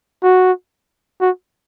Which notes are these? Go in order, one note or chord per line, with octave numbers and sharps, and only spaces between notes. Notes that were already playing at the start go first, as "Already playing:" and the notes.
F#4
F#4